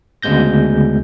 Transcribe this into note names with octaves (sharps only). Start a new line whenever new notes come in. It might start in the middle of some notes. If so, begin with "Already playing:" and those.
D2 C#3 G#3 B3 G6 A#6